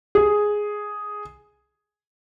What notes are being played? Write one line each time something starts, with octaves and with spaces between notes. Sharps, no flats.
G#4